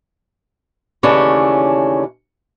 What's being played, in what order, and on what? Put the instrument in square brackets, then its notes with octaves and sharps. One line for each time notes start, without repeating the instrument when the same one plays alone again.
[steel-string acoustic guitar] D#2 C#3 E3 A3 C#4 D4